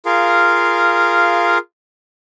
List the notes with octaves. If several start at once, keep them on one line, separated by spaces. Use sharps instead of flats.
F4 G#4 A#4 F5